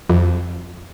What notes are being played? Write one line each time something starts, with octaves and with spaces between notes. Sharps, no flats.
F2